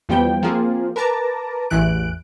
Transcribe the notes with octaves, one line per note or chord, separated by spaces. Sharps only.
E2 F3 G3 B3 G5
F3 A#3 C4 F4 G#4
A#4 B4 A5 A#5 D6
A1 E2 E3 F#6 D7